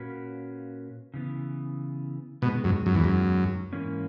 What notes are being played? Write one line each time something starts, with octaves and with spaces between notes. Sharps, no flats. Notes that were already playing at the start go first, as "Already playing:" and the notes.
Already playing: A#2 A#3 C#4 F#4 B4
C#3 E3 B3
B2 D#3 G#3 B3
F#2
F#2
E2
F#2
G#2 E3 A#3 C#4